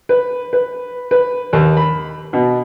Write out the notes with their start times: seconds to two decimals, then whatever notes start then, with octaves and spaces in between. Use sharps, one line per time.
0.09 B4
0.53 B4
1.11 B4
1.53 D#2
1.77 B5
2.33 B2